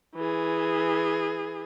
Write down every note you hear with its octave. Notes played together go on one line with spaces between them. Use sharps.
E3 G#4